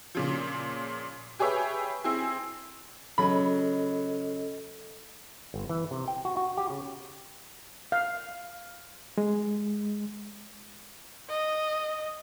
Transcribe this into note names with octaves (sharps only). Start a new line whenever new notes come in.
A#2 C#3 F3
G4 G#4 B4 C#5 E5 G5
C4 E4 G#4
C#3 F#3 A4 D#5 B5
G1
E3
C3
G5
F#4
F#4
G4
C#3
F5
G#3
D#5